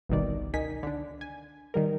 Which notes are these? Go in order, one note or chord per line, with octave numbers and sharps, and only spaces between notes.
G1 C2 B2 D#3 D5
C#2 D#3 D#4 G#5 B6
D3 D4
G#5
D#3 G3 A#4